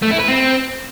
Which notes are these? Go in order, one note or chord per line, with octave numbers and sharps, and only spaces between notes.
A3
E4
B4
C4